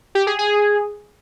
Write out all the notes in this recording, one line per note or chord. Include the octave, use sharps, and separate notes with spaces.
G4
G#4
G#4